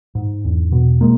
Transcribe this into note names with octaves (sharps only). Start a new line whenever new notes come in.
G#2
E2
B2
G#3 A#3